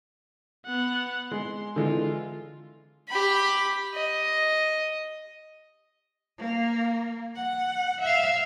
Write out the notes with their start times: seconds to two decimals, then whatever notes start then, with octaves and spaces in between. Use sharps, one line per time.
0.65 B3 F#5
1.32 G#3 C6
1.76 D3 E3 G#3 F4
3.09 G4 B5
3.95 D#5
6.39 A#3
7.36 F#5
8.01 E5 F5